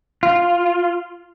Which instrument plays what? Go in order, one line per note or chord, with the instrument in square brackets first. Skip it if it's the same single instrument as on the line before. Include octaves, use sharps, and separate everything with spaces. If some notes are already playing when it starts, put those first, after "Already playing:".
[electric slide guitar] F4